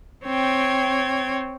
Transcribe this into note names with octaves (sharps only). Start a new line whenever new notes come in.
C4 C#5 G5 G#6